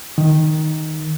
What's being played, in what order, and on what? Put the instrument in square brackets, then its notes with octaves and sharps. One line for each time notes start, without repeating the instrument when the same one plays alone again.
[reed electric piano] D#3